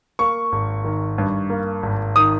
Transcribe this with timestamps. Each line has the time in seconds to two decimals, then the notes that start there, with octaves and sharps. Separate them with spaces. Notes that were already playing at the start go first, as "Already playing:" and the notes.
0.19 A#3 C#6
0.52 G#1
0.84 D#3
1.18 G2
1.50 A#3
1.83 G#1
2.16 D#3 D#6